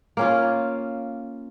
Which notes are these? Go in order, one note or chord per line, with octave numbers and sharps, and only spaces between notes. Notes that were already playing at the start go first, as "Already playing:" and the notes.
A#3 C#4 F4